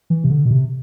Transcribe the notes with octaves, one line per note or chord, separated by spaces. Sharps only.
E3
C3
D3
B2
C3